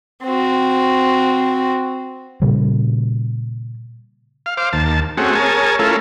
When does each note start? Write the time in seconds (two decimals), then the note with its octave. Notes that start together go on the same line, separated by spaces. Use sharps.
0.24 C4 F#4
2.42 A#2 C#3 G3
4.46 F5
4.57 C5 F5 D6
4.73 D#2 A5
5.17 A3 C4 C#4 F#4 G#4
5.35 G#4 A#4 C#5 G#5 A5
5.79 A3 C#4 E4 F4 A4 A#4